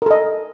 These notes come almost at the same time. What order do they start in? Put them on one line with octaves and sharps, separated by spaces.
A#4 A4 D#5